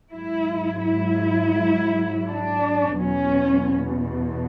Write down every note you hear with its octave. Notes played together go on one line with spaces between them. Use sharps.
G#2 F#3 E4
E4
D4
E2 B2 F#3 C#4